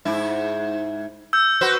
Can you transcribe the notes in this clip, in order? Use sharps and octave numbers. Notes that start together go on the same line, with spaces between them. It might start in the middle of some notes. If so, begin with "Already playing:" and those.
G#2 E4
E6 G6
F#4 B4 C5